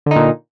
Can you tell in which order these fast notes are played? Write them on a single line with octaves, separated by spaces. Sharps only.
D3 D#4 A#2